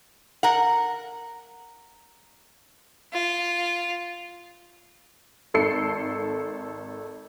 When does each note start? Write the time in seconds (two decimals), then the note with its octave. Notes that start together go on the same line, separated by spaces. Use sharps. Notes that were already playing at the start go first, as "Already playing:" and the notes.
0.43 A#4 F#5
3.13 F4
5.54 G#1 A4 C7 C#7